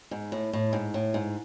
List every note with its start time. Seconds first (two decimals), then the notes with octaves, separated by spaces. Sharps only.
0.11 G#2
0.32 A2
0.53 A2
0.73 G#2
0.94 A2
1.14 G#2